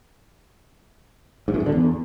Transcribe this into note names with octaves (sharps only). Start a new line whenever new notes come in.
G#2
F#2
G#2
D3
E2